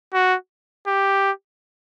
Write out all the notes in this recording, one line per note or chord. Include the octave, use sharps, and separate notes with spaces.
F#4
G4